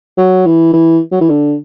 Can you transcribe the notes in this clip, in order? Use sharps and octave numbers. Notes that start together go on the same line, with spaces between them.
F#3
E3
E3
F#3
E3
D3